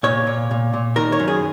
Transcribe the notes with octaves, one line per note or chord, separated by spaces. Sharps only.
A#2 C#5
A#2
A#2
A#2
D#3 A#4
C#5
F#2
G#4